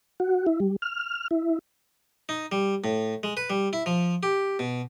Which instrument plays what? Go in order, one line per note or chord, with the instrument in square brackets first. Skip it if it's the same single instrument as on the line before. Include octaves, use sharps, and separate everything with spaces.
[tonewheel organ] F#4
E4
G3
F6
E4
[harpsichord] D#4
G3
A2
G#3
B4
G3
E4
F3
G4
B2